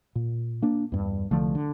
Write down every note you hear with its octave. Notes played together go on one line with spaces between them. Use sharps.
A#2
A#3 D4
E2 G2
C2 D3 F3 A3
D3